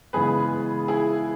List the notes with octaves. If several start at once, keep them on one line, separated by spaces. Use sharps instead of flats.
C#3 E3 G#3 B3 G#4 B4
E4 G#4